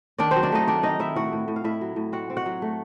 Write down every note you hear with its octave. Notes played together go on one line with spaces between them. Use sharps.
D#3 D4 D5
F#3 C4 C5
D4 D5
A3 D#4 D#5
D#3 D4 D5
D#3 D#4 D#5
D#3 E4 E5
A2 F#4 F#5
A2
A2
F5
A2 E4 E5
F#3
A2
C4 F#4 F#5
C4
F#4 F#5
F#3
A3